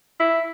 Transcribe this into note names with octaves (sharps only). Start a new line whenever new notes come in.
E4